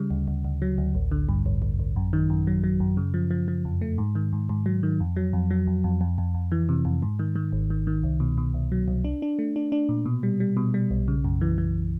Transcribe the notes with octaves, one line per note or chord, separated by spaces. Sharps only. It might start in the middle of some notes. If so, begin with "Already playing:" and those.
Already playing: C#3 G3
D2
D2
D2
F#3
D2
A1
D3
G2
A1
A1
A1
F#2
D#3
F#2
F#3
F#3
F#2
C#3
F3
F3
F3
F2
A3
G#2
D#3
G#2
G#2
F#3
D#3
F2
F#3
F2
F#3
F2
F2
F2
F2
F2
E3
C3
F2
G#2
D#3
D#3
G#1
D#3
D#3
C2
B2
B2
C2
F#3
C2
D4
D4
A3
D4
D4
A#2
B2
G3
G3
B2
G3
B1
C#3
F#2
E3
E3